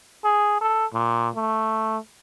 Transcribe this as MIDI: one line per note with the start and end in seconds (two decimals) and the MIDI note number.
0.25 0.60 68
0.61 0.86 69
0.93 1.29 46
1.35 1.98 57